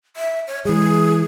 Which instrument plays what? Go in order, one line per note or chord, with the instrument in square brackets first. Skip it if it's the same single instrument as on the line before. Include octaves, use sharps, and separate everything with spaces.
[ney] E5
C#5
[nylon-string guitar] E3 G#3 [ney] G#4